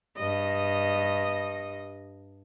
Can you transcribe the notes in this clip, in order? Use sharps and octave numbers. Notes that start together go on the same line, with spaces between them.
G2 D#5